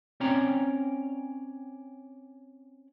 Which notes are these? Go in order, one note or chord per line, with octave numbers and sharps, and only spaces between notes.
C4 C#4 C#5 D5 G5 A#5